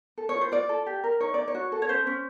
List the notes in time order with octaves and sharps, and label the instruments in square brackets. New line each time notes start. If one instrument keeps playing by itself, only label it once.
[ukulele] A4
C#5
F4
C5
F4 D5
A4
G4
A#4
D#4 C#5
D#4 D5
C#5
F#4
A4
C#5
C#4 C5
C#4